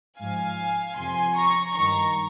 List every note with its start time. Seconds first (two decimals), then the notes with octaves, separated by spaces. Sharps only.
0.19 G#2 F3 F5 G#5
0.97 F2 C3 F3 G#5 C6
1.37 A#5 C#6
1.76 G2 D#3 A#5 C#6